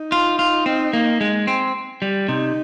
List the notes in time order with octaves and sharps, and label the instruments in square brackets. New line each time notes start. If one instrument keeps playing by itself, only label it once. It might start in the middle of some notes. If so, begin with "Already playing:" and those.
Already playing: [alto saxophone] D#4
[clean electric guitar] F4
F4
C4
A#3
G#3
C4
G3
[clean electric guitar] C3 [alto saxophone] D#4